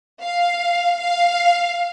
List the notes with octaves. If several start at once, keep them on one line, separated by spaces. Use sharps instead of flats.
F5
F5